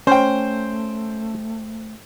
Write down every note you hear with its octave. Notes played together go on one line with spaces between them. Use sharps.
A3 C#4 C5 G5